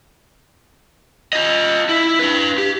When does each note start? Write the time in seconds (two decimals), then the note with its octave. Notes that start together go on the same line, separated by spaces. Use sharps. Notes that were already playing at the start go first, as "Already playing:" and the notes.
1.33 F4 D#5
1.89 E4
2.19 D4 B4
2.58 G4